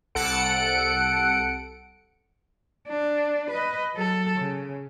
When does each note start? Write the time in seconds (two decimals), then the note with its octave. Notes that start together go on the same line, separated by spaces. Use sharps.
0.15 C2 A4 F#5 C#7 D7
2.89 D4
3.50 B4 D#5
3.94 F#3 A4
4.38 C#3